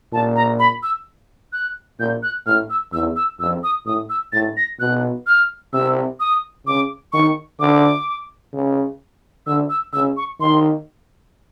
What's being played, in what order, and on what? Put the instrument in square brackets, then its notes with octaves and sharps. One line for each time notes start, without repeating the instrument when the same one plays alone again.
[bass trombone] A#2 [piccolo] A5
[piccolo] A#5
B5
E6
F#6
[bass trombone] A#2 [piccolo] G6
[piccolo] F#6
[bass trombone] A2 [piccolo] F6
[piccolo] E6
[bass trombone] E2 [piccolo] E6
[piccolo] E6
[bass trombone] F2 [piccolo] E6
[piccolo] D#6
[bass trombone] A2 [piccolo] D#6
[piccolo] E6
[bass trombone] A2 [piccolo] A6
[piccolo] A#6
[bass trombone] B2 [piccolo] F#6
[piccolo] F6
[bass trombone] C3 [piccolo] E6
[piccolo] D#6
[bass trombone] C#3 [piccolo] D6
[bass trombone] D#3 [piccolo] C#6
[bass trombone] D3 [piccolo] D6
[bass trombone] C#3
[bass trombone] D3 [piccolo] E6
[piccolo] E6
[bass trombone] C#3 [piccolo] E6
[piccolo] C#6
[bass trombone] D#3 [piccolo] C6